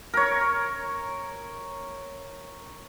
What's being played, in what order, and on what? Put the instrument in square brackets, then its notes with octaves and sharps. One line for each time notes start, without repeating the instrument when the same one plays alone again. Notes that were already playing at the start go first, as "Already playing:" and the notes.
[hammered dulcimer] A#4 C#5